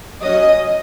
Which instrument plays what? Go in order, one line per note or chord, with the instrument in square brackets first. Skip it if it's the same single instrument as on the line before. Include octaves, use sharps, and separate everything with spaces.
[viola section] F#3 C#4 D#5